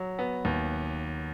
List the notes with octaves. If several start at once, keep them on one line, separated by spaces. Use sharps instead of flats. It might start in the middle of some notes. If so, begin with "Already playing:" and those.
Already playing: F#3
B3
D#2